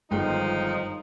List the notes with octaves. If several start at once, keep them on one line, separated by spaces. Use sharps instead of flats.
G1 D#3 F3 G#3 D#4 G5